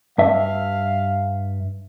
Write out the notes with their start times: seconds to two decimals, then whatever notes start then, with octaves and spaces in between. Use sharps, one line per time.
0.18 G2 E5 F5